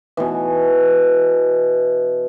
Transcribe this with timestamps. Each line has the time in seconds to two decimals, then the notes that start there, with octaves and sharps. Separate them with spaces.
0.17 B2 E3